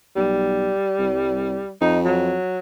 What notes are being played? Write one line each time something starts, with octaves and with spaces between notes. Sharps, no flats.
B1 G3
C2
F2 D#4
F#3